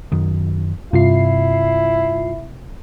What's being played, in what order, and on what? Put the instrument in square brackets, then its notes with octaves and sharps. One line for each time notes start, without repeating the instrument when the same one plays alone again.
[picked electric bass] F#2 D#3
[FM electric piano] G2 F4 C7 [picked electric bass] C3 [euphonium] E4